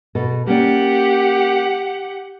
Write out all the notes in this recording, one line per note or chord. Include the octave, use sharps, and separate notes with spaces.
B2 A4
A#3 C#4 G4 D5 F#5